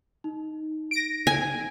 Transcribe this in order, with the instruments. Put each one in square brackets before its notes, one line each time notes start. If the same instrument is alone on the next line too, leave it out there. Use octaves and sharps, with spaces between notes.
[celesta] D#4
[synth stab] A#6 D7
[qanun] G#5